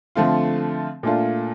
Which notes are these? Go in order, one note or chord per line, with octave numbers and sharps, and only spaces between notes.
D3 F3 A3 C4 F4
A#2 A3 D4 F4